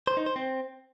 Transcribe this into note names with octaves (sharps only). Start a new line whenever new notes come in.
C5
D#4
C5
C4